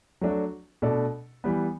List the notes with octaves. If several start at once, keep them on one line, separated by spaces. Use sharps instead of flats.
F#3 A3 D4 F#4
B2 A3 D4 A4 D5
E3 G3 B3